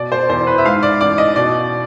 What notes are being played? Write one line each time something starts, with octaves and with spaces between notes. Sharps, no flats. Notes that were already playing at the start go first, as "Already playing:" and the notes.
Already playing: B2 D5
C5
E2 C5
B4
E5
G#2 F5
D5
A1 D5
D#5
B2 D5